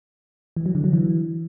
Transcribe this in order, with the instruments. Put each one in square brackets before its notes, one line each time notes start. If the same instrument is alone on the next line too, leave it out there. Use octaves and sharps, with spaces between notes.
[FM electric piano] E3
F#3
D3
F#3
E3